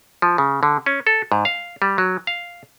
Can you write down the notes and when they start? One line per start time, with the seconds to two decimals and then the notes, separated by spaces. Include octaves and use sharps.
0.22 F3
0.38 C#3
0.63 D3
0.86 C#4
1.07 A4
1.32 G#2
1.45 F5
1.82 G3
1.98 F#3
2.27 F5